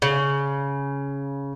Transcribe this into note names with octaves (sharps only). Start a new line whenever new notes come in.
C#3